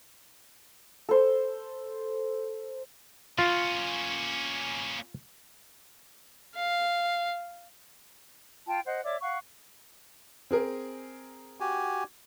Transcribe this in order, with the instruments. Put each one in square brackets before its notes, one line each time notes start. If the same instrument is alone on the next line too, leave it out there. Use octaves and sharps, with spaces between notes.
[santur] A4 C5
[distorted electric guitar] A#3 C#4 [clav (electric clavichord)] F4
[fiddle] F5
[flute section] F4 G5 A5
C5 D#5 F#5
C#5 D5 E5 D6
F5 F#5 C#6
[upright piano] C4 G#4 A#4
[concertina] F#4 G4 G#5